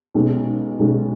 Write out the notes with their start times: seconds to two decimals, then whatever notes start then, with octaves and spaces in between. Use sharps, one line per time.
0.14 B1 B2 G#3 C#4
0.79 B1 B2 G#3 C#4